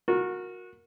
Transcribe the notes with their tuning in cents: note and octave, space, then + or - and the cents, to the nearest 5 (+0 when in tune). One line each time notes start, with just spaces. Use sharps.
F#4 -25 A#4 +0